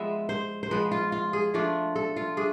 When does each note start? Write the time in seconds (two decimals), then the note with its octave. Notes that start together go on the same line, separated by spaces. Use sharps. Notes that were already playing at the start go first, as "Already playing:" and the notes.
Already playing: F3 G#3 B3 E5
0.29 C5
0.63 C5
0.71 F3 G#3 B3 B4
0.92 F4
1.12 F4
1.33 G#4
1.54 F3 A3 D4 F4
1.96 A4
2.16 F4
2.37 A3 D4 G#4